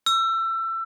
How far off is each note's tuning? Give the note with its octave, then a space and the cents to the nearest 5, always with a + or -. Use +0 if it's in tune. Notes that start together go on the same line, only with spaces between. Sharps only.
E6 +25